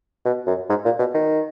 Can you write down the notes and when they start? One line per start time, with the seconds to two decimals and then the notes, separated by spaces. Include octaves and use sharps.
0.25 B2
0.47 F#2
0.69 G#2
0.85 A#2
0.99 B2
1.14 D#3